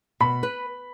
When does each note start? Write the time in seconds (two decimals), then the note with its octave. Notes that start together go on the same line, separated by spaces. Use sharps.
0.20 B2 B5
0.43 B4